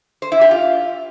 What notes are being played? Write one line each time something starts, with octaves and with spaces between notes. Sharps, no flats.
C5
E4
G4
F4